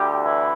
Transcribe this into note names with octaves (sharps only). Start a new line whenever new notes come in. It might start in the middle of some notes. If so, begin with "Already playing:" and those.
Already playing: D2 D3 G3 G4
E3 E4